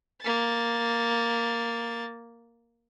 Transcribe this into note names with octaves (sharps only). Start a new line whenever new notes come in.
A#3 A6